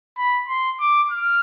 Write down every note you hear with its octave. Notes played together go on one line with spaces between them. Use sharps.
B5
C6
D6
F6